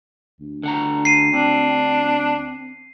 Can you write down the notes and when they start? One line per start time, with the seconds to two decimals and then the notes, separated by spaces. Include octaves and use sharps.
0.40 D2
0.63 D3 F#5 A#5
1.05 C7 D#7
1.33 C4 D4